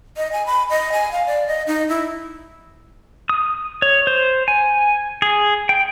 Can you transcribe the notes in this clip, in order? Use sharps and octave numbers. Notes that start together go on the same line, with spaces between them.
D#5
G#5
B5
D#5
G#5
F5
D5
D#5
D#4
E4
D#6
C#5
C5
G#5
G#4
G5